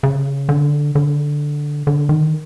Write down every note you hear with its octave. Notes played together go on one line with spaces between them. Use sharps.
C#3
D3
D3
D3
D#3